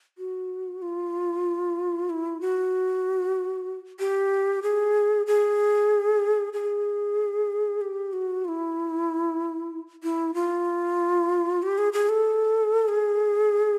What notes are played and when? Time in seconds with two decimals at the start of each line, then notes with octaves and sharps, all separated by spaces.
0.18 F#4
0.82 F4
2.09 E4
2.41 F#4
3.99 G4
4.63 G#4
5.27 G#4
6.53 G#4
7.81 G4
8.13 F#4
8.45 F4
8.48 E4
10.03 E4
10.34 F4
11.62 G4
11.78 G#4
11.93 G#4
12.09 A4
12.88 G#4